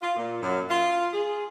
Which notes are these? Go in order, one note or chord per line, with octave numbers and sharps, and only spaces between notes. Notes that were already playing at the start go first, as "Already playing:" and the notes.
F4
A#2
F#2
F4
G#4